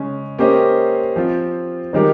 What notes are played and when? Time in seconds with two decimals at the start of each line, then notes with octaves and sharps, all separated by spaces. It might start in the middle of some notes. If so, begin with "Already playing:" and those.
Already playing: C#3 G#3 C#4
0.38 A#3 C#4 G4 C5 D#5
1.16 F3 C4 F4
1.93 D#3 G#3 D#4 G4 A#4